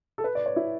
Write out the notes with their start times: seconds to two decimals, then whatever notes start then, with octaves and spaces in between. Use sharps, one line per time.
0.18 A4
0.24 B4
0.35 D5
0.46 C#5
0.56 E4